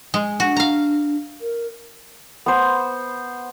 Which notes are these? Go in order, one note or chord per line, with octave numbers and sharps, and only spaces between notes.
G#3
D4 F#4
F5 A#5
A#4
B3 C5